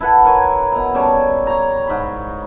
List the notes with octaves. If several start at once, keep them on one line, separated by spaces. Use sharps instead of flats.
E4 A4 B4 F#5
A#4 C#5 G#5
B2 A#5
C#3 G3 C#5 A5
C#5 A#5
G#2 B5